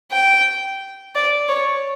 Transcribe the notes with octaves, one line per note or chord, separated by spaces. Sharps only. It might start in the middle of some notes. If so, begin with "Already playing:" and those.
G5
D5
C#5